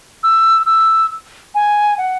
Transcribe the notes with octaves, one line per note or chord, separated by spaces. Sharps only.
E6
E6
G#5
F#5